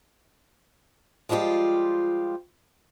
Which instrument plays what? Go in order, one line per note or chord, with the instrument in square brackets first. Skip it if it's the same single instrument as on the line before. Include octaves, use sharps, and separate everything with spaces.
[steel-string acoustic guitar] F3 G3 G#3 F4 G4